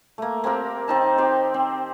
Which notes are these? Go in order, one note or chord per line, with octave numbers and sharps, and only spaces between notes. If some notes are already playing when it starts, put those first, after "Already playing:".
A3 A#3
A#3 C4 G4 A#4
D#3 C4 D#4 A5
C4 G4 C5
C4